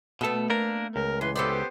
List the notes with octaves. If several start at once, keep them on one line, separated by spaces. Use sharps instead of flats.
B2 A3 B3 A4
A#3 D4 A#4
C#2 A#4
E3 B4 C6
B3 G4 A4 B4 C5 D5